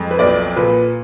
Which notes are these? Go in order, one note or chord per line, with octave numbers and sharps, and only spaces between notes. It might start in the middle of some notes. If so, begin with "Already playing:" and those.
Already playing: F2 G#3
B4
B1 D5
A#2 B4